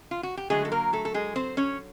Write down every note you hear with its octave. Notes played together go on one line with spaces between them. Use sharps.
F4
F#4
G4
D3 F#3 G#3 A3 G#4
A4
A#3 A#4
A3 A4
A4
G#3 G#4
C4 C5
C#4 C#5